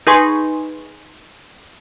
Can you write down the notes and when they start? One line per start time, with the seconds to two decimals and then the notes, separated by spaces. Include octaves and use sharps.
0.07 D#4 G#4 B4 G#5 C6 C#6